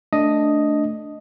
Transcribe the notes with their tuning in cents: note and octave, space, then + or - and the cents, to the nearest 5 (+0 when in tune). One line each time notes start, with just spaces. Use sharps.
A3 +0 D4 +0 D#5 +0